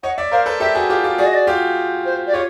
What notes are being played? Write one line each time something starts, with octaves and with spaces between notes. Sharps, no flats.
C#5 D#5 F#5
D5 E5
A#4 C5 F5
A4 B4
G4 A4 E5
F#4 G#4
F4 G4
F4 G4
F#4 G#4 D5
D#5
D5
F4 G4
C5
D5
F4 G4 C#5